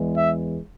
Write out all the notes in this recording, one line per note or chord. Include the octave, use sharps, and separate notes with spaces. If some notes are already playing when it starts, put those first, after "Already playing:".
Already playing: E2 E3 G#3
E5